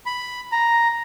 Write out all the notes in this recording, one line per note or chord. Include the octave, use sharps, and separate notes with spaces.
B5
A#5